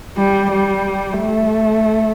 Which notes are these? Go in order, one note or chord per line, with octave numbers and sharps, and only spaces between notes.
G3
G3
A3